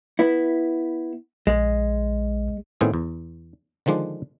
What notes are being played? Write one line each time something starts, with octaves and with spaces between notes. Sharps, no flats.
B3 E4
A#1 G#3
A2 D#3 B3 C4 G#4
E2
D3 D#3 F3 G#3 D4